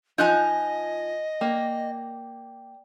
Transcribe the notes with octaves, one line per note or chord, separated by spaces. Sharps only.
F3 D#4 F4 D#5 G#5 F#6 G6
A#3 D5 G5